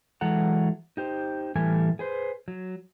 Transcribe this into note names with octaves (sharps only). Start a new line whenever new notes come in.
E3 F#3 G#3 A4 F#5 A#5
D#4 G4 C5
A2 E3 G3 G4 A4 G#5
G#4 B4 C5
F#3